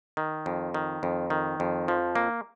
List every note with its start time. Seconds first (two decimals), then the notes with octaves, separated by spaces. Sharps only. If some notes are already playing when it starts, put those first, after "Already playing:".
0.17 D#3
0.46 F2
0.74 D#3
1.03 F2
1.30 D#3
1.60 F2
1.88 F3
2.15 A#3